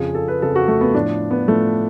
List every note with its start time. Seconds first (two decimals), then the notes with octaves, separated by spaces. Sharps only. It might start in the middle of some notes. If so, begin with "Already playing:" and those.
Already playing: F2 C#3 F3 G#4
0.15 A4
0.28 B4
0.42 F2 C#3 F3 A4
0.56 F#4
0.68 A3
0.81 B3
0.94 A2 F3 D4
1.31 B3
1.48 A2 F3 A3